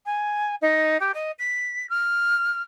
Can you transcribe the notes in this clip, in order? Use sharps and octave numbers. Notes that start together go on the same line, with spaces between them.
G#5
D#4
G4
D#5
B6
F6